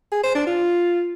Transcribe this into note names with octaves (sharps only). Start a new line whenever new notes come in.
G#4
C5
D4
F4